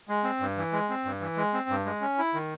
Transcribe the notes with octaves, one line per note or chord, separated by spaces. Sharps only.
G#3
C4
G2
E3
G#3
C4
G2
E3
G#3
C4
G2
G#3
C#4
E4
D#3